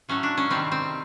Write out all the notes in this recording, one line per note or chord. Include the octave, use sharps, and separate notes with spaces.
A2 F#3 A3 C#4
D4
C#4
C3 D#3 G3 C4
C4